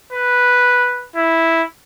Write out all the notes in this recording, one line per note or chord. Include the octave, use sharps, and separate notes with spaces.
B4
E4